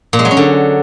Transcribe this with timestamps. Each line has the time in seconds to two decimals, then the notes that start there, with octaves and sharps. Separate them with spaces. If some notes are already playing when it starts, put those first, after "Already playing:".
0.13 A#2
0.19 G#3
0.25 F#3
0.31 C#4
0.37 D3